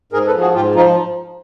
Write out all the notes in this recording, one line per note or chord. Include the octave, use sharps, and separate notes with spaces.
G#2 G#4 A#4
A4 B4
F3
F#4 G#4
G#2 F4 G4
F3 D#4 F4